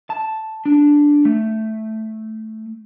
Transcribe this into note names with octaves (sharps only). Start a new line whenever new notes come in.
A5
D4
A3